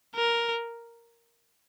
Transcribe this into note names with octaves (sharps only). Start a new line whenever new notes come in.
A#4